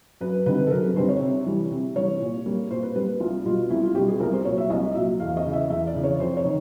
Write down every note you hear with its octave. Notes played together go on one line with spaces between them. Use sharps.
F#2 B4
D3 G3 C4 D#4 B4
A4
F#2 A#4
B4
D3 G3 C4 D#4 C5
C#5
C3
E3 G3
C3
E3 G3 C#5
A#2
G3 A#3
A#2 C5
B4
G3 A#3 B4
C2 F4
B2 G3 F4
C2 E4
F4
B2 G3 G4
G#4
C2 A#4
C5
A#2 F#3 C#5
E5
C2 D#5
A#2 F#3 E5
E2 F5
D#5
C#3 E3
E5
E2 E5
D5
C#3 E3
C#5
F2 C5
C#5
D#3